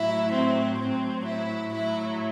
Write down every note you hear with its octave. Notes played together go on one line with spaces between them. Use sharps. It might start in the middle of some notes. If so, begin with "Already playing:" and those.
Already playing: A2 F#3 E4
C4
A2 F#3 C4
E4
A2 F#3 E4